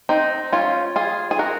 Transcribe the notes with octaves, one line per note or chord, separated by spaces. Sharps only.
C4 D#4
C#4 F4
F4 G#4
G#4
F#4 A#4